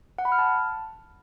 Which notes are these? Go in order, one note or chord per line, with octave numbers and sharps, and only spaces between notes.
F#5
B5
F6
A5